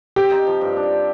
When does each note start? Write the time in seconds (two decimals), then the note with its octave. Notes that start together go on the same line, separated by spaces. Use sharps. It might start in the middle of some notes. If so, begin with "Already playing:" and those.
0.16 C4 G4
0.31 D#4
0.47 F3
0.61 G2
0.77 D4
0.92 G4